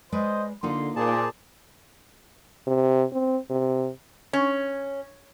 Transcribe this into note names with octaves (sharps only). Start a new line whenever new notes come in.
G#3 B4 C5 D5 D#5
D3 A#3 D#4 F4 C6
A#2 G#4 C5 D5 A5
C3
C4
C3
C#4